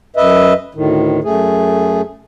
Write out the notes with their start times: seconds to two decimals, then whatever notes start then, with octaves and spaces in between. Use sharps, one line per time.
0.16 F#2 B4 D#5 E5
0.75 D2 A2 D#3
1.24 F#2 A3 G#4